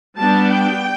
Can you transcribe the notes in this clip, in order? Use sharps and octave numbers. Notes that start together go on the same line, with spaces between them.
G3 B3 D4 A5
G5